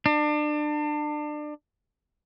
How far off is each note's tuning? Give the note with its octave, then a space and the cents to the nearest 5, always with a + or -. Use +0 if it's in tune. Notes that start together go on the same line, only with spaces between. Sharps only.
D4 +30